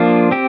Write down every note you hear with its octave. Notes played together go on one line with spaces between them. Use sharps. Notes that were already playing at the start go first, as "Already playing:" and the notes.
Already playing: F3 A#3 D4 F4
C4 G4